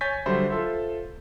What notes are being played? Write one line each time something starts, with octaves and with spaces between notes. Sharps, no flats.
C#5 G#5 C#6 G6 A6 B6
D3 F#3 G3 C5 E5 B5
F4 A4 C5 E5